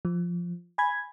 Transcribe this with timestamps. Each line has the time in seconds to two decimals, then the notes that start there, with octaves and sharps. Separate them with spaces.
0.05 F3
0.78 G#5 B5 G#6